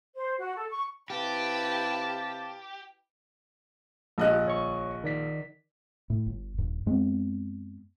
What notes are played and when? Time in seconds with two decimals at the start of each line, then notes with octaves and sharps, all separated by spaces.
0.15 C5
0.39 F#4
0.56 A4
0.69 C#6
1.10 C3 E4 G4 B4 F5 A5
4.18 A#1 F4 G4 D#5 F#6
4.45 G1 C#5 C#6
5.04 D#3 D5 B6
6.10 A2
6.26 G1
6.58 D#1 G2
6.86 F#2 G#3 B3 C4